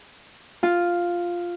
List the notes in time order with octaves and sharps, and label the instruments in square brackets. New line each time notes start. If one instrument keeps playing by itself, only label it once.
[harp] F4